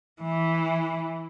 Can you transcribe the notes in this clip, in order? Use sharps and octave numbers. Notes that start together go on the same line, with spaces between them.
E3